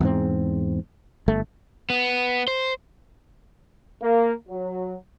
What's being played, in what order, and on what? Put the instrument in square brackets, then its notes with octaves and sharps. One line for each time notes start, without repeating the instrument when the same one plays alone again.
[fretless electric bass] E2 G#2 C4
G1 A3
[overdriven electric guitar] B3
C5
[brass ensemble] A#3
F#3